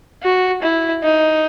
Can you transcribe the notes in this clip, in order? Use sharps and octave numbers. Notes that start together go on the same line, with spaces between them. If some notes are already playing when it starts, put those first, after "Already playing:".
F#4
E4
D#4